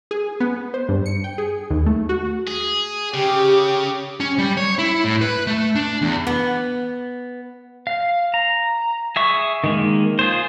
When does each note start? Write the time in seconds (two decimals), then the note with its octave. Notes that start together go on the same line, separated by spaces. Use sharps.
0.11 G#4
0.40 B3
0.74 C5
0.89 G2
1.06 C#7
1.24 G5
1.38 G#4
1.70 D#2
1.86 A3
2.09 F#4
2.47 G#4
3.14 C#3 G4
4.20 C#4
4.38 G3
4.57 C#5
4.79 E4
5.04 A2
5.21 B4
5.47 A3
5.75 D4
6.02 E2
6.27 B3
7.87 F5
8.34 A#5
9.16 G#4 E5 C#6
9.64 D#3 G#3 A#3
10.19 F4 G#4 C5